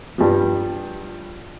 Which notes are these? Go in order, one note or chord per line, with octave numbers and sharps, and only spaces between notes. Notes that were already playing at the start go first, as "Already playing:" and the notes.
G2 F3